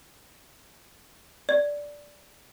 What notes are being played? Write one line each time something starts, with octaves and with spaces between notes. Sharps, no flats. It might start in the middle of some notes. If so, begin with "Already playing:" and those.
D5